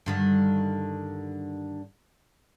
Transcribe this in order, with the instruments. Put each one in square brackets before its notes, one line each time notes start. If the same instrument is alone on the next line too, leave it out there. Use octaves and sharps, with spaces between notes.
[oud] G2 D3 D#3